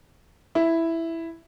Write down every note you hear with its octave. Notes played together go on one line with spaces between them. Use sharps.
E4